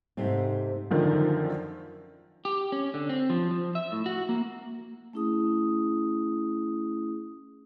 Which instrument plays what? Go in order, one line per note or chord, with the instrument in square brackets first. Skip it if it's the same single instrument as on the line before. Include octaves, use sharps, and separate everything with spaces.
[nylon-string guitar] G#2 C3 A3 C4
[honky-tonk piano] F#2 D3 D#3 F3
[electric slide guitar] G4
C#4
D3
C4
F3
F3
E5
A2
F#4
A#3
[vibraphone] A3 C#4 E4 G#4 D#6